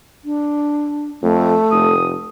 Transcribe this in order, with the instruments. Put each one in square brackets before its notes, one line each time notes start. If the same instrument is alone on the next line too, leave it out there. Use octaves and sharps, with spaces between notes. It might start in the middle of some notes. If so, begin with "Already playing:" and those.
[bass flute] D4
[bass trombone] F2 [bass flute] A3
[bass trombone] F1 [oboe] D#6